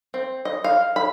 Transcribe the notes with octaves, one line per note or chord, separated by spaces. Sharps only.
C4
D#5
F5
B5